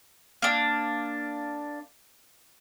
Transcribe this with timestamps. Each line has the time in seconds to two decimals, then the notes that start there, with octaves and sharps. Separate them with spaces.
0.42 A#3 D4